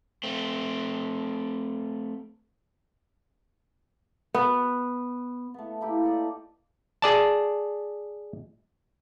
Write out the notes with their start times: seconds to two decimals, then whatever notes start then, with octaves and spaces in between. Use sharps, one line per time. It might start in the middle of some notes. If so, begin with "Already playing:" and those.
0.23 A3 C4
4.34 B3
5.54 A3 B3
5.81 A#3 E4 G4
6.03 A4 D5 D#5
7.02 G#4 D5 A5